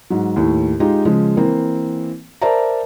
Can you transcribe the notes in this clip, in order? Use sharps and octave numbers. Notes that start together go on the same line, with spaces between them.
G#2 F#3
D#2 A2
G#3 D#4 F4 G4
C#3 F3 G#3
E3 A#3 C4
A#4 C5 D5 E5 A5 A#5